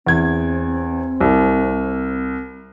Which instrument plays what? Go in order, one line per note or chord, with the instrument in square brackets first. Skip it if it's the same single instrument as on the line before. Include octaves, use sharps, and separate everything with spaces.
[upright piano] E2 G#6 [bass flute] C4
[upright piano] C2